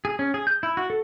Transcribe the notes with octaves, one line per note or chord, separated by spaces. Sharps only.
G#4
C#4
G#4
G6
E4
F#4
A4